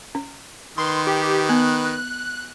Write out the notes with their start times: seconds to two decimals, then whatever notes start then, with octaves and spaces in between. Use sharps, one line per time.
0.15 C#4
0.78 D#3 B4 C6
1.07 G4
1.49 B3 F#6